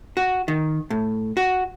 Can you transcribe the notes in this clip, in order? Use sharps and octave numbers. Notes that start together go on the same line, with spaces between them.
F#4
D#3
A2
F#4